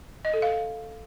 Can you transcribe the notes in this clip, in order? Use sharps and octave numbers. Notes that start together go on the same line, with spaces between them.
D#5
A4
F5